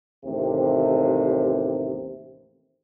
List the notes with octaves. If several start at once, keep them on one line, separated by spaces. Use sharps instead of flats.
A1 D#2 C3